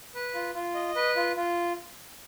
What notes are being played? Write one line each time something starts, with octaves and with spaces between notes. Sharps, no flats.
B4
F4
F4
D#5
B4
F4
F4